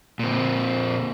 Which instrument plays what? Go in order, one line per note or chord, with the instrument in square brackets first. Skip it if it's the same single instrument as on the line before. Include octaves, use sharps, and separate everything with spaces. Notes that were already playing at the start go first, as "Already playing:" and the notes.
[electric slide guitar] A#2 C4